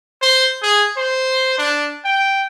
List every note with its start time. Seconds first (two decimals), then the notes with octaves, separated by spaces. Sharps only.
0.22 C5
0.63 G#4
0.97 C5
1.58 D4
2.05 G5